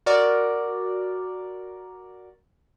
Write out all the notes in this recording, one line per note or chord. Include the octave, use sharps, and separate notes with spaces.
F#4 A#4 D5